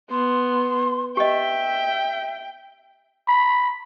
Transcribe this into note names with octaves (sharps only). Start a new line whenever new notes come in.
B3 C6
G4 D#5 E5 G5
B5